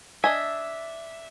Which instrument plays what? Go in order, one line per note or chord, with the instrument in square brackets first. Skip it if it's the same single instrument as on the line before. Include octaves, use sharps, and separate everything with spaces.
[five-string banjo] D4 D#5 G#5 [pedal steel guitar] E5